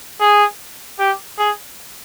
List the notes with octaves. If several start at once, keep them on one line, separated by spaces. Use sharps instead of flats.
G#4
G4
G#4